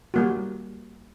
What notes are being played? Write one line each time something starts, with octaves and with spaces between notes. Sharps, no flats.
G3 A#3 F#4